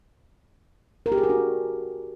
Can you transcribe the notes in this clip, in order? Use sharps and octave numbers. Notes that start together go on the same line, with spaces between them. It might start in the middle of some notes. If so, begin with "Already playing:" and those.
A#4
G4
G#4
F#4
D4